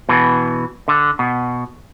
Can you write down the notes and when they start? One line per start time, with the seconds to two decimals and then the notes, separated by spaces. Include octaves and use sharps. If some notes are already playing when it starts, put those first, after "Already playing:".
0.09 B2 E3
0.88 D3
1.19 B2